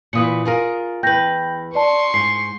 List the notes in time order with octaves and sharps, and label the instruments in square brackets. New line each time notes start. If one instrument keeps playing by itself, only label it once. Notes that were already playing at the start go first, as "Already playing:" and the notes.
[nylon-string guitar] A#2 E3 B4 [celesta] D#6 C#7
[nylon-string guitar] F4 G#4 A#4
[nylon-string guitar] E2 B4 [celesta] G5 G6 A#6
[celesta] D5 A5 [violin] C6 C#6
[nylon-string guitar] G#2 [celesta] C7